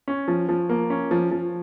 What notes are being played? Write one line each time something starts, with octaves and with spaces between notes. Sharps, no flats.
C#4
F3
F3
A#3
C#4
F3
F3